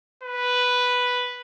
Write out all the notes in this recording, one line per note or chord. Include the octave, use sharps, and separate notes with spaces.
B4